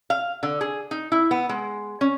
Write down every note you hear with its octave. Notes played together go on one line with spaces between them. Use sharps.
F5
D3
G#4
D#4
E4
B3
G#3
C#4